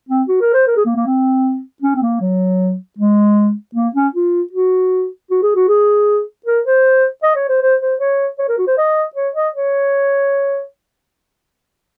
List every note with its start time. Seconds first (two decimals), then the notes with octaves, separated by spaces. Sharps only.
0.09 C4
0.28 F#4
0.41 A#4
0.54 C5
0.67 A#4
0.77 G#4
0.85 A#3
0.96 A#3
1.06 C4
1.82 C#4
1.95 C4
2.02 A#3
2.21 F#3
2.98 G#3
3.75 A#3
3.95 C#4
4.15 F4
4.53 F#4
5.31 F#4
5.43 G#4
5.55 F#4
5.68 G#4
6.46 A#4
6.65 C5
7.23 D#5
7.36 C#5
7.49 C5
7.62 C5
7.81 C5
8.00 C#5
8.39 C#5
8.49 A#4
8.58 F#4
8.67 C5
8.78 D#5
9.16 C#5
9.35 D#5
9.55 C#5